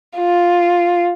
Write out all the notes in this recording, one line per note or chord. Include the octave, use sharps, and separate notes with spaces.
F4